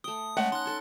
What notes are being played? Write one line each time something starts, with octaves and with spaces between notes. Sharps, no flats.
A3 G5 D#6
G#3 A3 C#4 D#5 F#5 A5
D#4 C6 F#6
D#4 A4 G#5